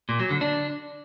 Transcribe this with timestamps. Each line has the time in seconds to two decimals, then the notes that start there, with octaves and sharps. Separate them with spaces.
0.09 A#2
0.20 F#3
0.30 D3
0.41 D4